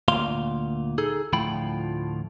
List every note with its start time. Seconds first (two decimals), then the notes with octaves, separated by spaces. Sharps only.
0.08 D2 A#2 F5 C6
0.98 D#4 G#4 A4
1.33 D2 A2 F3 F4 G5 B5